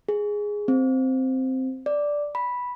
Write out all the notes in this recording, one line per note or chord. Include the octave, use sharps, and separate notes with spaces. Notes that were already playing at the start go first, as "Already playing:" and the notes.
G#4
C4
D5
B5